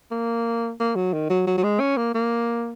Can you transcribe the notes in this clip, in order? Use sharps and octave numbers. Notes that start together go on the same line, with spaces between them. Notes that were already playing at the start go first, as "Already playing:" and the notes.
A#3
A#3
F#3
D#3
F#3
F#3
F#3
G#3
C#4
A#3
A#3